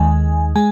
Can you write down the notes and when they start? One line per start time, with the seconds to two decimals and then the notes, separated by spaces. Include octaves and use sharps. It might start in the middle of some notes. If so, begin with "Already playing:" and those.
Already playing: D#2 D#3 G#3 G#5
0.56 G#3 G#5